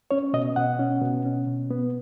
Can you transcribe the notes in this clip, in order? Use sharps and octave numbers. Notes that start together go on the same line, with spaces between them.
C#4 C#5
B2 D#5
B2 F#5
C#4
B2
C#4
B2
B3